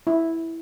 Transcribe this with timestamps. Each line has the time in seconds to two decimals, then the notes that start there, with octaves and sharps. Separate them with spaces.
0.07 E4